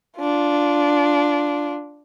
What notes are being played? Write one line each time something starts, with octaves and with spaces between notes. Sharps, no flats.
D4 F4